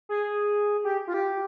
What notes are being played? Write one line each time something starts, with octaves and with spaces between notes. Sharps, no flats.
G#4
G4
F4
G4